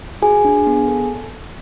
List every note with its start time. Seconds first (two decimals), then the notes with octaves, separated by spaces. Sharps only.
0.22 F#4 G#4 G#5
0.45 D4
0.67 B3
0.88 A4